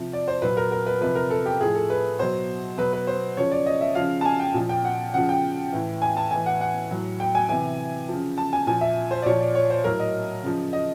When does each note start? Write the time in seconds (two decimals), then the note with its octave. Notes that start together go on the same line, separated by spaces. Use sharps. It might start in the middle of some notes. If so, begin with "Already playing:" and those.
Already playing: C3 F3
0.13 D5
0.28 C5
0.42 A#2 F#3 B4
0.57 A#4
0.72 A#4
0.87 B4
1.01 C3 F3 B4
1.15 A#4
1.31 A4
1.46 G4
1.60 A2 F3 G#4
1.75 A4
1.90 B4
2.19 B2 F#3 C5
2.78 B2 F#3 B4
2.93 B4
3.07 C5
3.37 C#3 F3 C#5
3.52 D5
3.66 D#5
3.81 E5
3.95 C#3 F3 F5
4.21 A5
4.25 G#5
4.40 G5
4.54 A#2 F3
4.69 G5
4.85 F#5
5.14 C#3 F3 F#5
5.29 G5
5.72 A2 E3
6.02 G#5
6.17 A5
6.31 A2 E3 G#5
6.46 F#5
6.61 F#5
6.91 A2 F#3
7.20 G5
7.35 G#5
7.49 C3 E3 G#5
8.09 C#3 F3
8.38 A5
8.53 G#5
8.67 A#2 F3 G#5
8.81 E5
9.11 C5
9.22 D5
9.26 A#2 F3 C#5
9.40 D5
9.55 C#5
9.70 C5
9.84 A2 F#3 A#4
10.00 D#5
10.43 C#3 F3
10.73 D#5